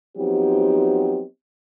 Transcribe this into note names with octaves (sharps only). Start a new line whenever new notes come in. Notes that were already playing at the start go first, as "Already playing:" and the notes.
F3 F#3 B3 C4 D#4 G4